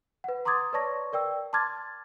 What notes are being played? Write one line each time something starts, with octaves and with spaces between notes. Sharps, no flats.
B4 F#5
A#5 C6 D6 D#6 G#6 A6
B4 C#5 D5 A5 C#6 A#6
A#4 D5 G5 E6
A5 C6 D6 F6 G#6 A6